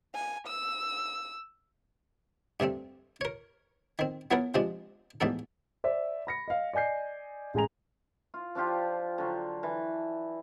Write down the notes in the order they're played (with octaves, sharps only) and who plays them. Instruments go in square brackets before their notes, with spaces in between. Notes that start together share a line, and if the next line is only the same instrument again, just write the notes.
[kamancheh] G#5
E6
[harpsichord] G2 C3 A3 C4
A#4 C#5
D#3 C4
F#3 B3 E4 F#4 A4 A#4
C3 F3 G#3 D4
A1 E2 G#2 D4 A4
[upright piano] C5 D5 E5
B5 A#6 C#7
D#5 F5
D5 D#5 G#5 G6 C7
A1 G#3 G#4 G#5 A#5 F7
[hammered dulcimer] F4
F3 D4 F4 G4
D3 F#3 F4
E3